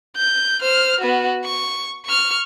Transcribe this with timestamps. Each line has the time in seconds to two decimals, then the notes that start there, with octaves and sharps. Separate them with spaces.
0.17 G6
0.61 C5 F6
1.00 B3 F#4
1.45 C#6
2.06 C#6 F6